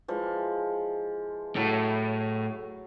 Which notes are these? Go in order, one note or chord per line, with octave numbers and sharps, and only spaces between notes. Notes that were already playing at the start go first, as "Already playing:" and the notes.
E3 F3 G#3
A2 F#3